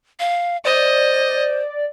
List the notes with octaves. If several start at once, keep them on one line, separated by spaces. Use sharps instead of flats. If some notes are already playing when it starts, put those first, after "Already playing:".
F5
C5 D5 D#5